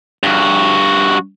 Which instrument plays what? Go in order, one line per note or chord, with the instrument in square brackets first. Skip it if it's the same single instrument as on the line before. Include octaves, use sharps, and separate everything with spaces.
[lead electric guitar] G2 F#4